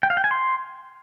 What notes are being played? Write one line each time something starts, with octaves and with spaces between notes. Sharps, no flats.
G5
F5
G5
G#5
C6